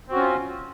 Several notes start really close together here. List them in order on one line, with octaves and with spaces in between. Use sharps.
C4 F#4 C#4 F4